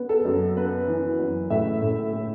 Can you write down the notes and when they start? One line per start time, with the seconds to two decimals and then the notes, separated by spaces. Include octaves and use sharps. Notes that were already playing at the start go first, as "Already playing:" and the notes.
Already playing: B3
0.09 A4
0.25 F#2
0.57 B3 B4
0.88 E3
1.19 F#2
1.50 A2 E5
1.82 A2
2.13 A2